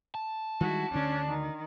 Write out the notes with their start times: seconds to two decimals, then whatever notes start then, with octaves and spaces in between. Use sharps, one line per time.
0.15 A5
0.61 D#3 G3 G#3 E4 F#4
0.91 D2 D3 C#4 D4
1.28 D#3